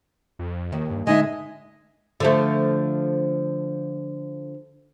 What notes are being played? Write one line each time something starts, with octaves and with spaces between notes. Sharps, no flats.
F2
D#2 D#3
G2
D3 G#3 D#4 D#5 E5 G#5
D3 F3 A3